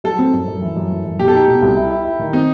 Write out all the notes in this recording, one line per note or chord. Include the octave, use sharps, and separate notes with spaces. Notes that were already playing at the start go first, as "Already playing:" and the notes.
F#3 A4
C4
F#2
F#2
E3
F#2
E3
F#2
B2 G4
A4
D#4 G4
B2
C2
E4
E4
E4
D#3
C4 D#4